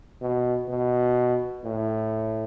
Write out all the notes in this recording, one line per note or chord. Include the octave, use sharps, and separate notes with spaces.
B2
B2
A2